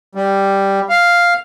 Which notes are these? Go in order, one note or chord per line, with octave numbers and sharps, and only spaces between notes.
G3
F5